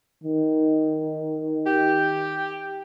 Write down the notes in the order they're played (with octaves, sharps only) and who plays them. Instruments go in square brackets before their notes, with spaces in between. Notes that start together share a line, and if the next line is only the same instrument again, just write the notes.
[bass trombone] D#3
[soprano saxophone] G4